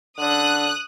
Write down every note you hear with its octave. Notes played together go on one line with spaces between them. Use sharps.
D3 D#6 F#6